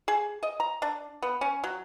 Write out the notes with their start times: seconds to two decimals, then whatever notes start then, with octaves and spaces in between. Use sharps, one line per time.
0.08 G#4
0.43 D#5
0.60 A#5
0.82 D4
1.22 B3
1.41 C#4
1.64 F#3